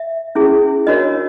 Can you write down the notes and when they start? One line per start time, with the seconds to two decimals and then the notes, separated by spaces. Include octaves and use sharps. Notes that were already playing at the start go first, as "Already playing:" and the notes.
Already playing: E5
0.35 C#4 E4 G#4
0.87 D4 F#4 A#4 C#5 D#5